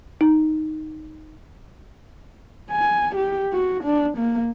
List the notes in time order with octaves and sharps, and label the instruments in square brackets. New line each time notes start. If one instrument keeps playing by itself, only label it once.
[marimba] D#4
[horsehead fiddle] G#5
G4
F#4
D4
A#3